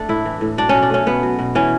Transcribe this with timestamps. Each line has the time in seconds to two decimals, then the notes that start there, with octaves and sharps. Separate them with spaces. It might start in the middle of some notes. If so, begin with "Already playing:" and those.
Already playing: A3 D4
0.09 A2 E4
0.26 E3
0.41 A2
0.57 F#3 D4
0.69 B2 C#4
0.82 D4
0.90 A3 C#4
1.06 B2 B3
1.23 F#3
1.39 B2
1.55 E3 C#4